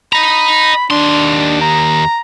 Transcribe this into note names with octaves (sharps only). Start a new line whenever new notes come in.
D#5 A#5 B5
D#2 D4 C6
A#5